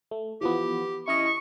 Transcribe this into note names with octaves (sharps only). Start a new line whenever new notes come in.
A3
E3 F3 B3 G4
C#4 E4 D#5 C#6